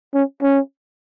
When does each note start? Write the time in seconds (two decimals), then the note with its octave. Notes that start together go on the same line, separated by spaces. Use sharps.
0.15 C#4
0.42 C#4